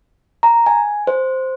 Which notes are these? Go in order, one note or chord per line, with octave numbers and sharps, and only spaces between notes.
A#5
G#5
C5